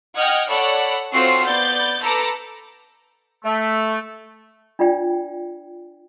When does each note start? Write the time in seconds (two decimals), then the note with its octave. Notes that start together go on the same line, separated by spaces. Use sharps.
0.17 D#5 F#5 G5 F6 G#6
0.49 A4 C#5 D5 F#5 B5
1.13 C4 F4 F#4 A4 C#5 C7
1.47 B3 D5 G6 A6
2.02 A4 B4 A#5 D6 A#6
3.44 A3
4.79 D4 F4 D5 G5